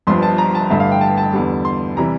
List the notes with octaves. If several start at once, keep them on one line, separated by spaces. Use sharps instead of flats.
G1 G2 F3 C6
A5
A#5
A5
A1 G2 D3 E5
F5
G5
A5
A5
E2 D3 G3
C6
C3 E3 G3 A#5